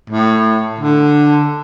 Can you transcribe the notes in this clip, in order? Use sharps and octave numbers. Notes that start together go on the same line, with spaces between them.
A2
D3